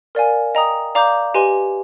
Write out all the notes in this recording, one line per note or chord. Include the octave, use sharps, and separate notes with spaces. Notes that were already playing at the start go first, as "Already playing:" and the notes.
A#4 D5 F5 G#5
D#5 G5 A#5 D#6
D5 F5 A#5 D6 G6
G4 B4 D#5 G#5 C6